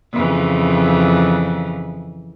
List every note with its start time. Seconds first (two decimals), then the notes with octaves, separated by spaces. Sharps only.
0.13 F2 C#3 E3